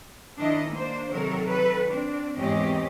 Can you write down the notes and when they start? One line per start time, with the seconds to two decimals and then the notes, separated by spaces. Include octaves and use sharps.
0.39 D#3 D4 E4 D#5
0.70 A#3 D4 C5
1.12 C3 D#3 F#3 A4 A#4
1.48 D#3 A4 B4
1.87 C4 D4
2.36 E2 G#2 C4 C#4 G4 D#5